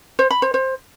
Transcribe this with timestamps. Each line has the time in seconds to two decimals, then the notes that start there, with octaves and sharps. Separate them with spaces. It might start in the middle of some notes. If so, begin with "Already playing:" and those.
0.19 C5
0.31 B5
0.42 C5
0.54 C5